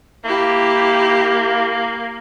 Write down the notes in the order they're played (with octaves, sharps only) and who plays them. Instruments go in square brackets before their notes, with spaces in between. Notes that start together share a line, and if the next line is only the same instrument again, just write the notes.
[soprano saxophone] A#3 [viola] E4 G4